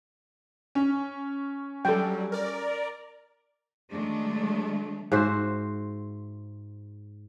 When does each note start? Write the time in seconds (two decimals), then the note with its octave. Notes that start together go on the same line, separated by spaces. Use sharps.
0.75 C#4
1.85 F#3 G3 A4 G5
2.32 A#4 D5
3.90 D#3 F#3 G#3 A3 D4
5.12 G#2 F#4 C5 E5